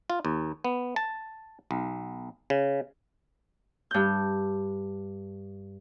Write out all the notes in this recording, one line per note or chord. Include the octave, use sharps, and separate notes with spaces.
F4
D#2
B3
A5
B1
C#3
G2 G6